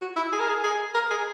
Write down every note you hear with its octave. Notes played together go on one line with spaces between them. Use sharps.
F#4
E4
G#4
A#4
G#4
G#4
A#4
G#4